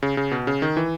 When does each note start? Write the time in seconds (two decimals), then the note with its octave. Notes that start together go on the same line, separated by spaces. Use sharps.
0.02 C#3
0.17 C#3
0.31 B2
0.47 C#3
0.62 D#3
0.77 E3